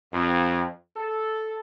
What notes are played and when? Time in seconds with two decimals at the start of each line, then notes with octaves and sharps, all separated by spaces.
0.13 F2
0.95 A4